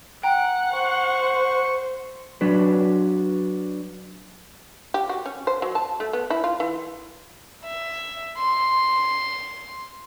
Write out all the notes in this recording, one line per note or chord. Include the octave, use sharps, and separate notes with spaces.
F#5 G5 A#5
C5 C#6
F#3 D4 F#4 B4
G4
F#4
C#4
C5
F#3
A5
A3
B3
E4
F4
E3
E5
C6